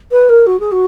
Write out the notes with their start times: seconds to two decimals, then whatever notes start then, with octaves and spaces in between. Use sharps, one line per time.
0.12 B4
0.29 A#4
0.46 F#4
0.60 G#4
0.72 F#4